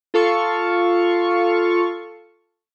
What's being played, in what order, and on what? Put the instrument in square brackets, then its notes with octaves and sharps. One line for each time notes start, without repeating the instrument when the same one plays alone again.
[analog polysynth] F4 A4 F5 C#6